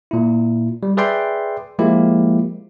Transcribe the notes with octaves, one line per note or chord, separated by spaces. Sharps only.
A#2 E4
G3
G#4 B4 D5 E5 G5 C6
F3 G#3 A#3 E4 G4